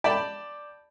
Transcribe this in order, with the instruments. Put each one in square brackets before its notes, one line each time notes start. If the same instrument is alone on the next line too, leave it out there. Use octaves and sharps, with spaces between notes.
[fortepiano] D5 G5 A5 B5